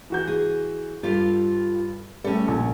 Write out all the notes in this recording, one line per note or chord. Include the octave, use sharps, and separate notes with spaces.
E3 F#4 G6
G#4
G2 F4 G4 A4
G3 A3 C#4 A4
A#1